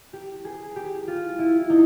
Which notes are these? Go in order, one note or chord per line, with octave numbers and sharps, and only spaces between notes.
G4
G#4
G4
F4
E4
D#4